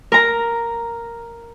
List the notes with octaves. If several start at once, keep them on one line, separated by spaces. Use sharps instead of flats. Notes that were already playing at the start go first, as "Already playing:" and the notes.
A#4 A#5